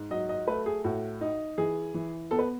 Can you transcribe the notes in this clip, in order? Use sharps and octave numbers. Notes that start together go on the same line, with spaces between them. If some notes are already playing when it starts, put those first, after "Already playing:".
Already playing: G#2
F#3 D#5
D#5
A3 B4
G#4
A2 F#4
D#4
E3 G#4
E3
B3 A4
B4